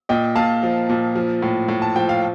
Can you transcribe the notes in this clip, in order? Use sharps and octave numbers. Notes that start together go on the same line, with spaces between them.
A#2 D#5 G5
A#2 F5 A5
F3
A#2
F3
A2
A2
A5
F3 G5
F5